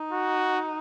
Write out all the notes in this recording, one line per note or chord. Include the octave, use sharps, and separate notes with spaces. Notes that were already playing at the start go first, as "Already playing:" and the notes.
Already playing: D#4
F#4